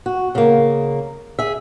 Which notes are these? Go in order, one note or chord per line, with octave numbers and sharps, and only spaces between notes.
F#4
C#3 A#3
G#4 E5